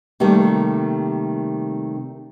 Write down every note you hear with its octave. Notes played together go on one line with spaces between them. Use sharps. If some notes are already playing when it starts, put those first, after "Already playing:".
C3 D#3 G3 A3 A#3